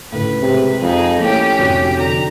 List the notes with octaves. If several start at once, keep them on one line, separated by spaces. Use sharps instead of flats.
C#2 A2 B4
C3 G#3
F2 D#4 G#4
A2 A#3 C#4 G4
F1 C3 F#4
D3 A#5